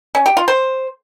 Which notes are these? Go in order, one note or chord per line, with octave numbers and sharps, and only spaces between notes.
C#4
G4
F4
C5